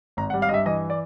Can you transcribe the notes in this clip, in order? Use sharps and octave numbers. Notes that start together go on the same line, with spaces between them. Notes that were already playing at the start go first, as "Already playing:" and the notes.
G#1 A#5
F#5
G3
F5
G2 D#5 E5
E3 D#5
D5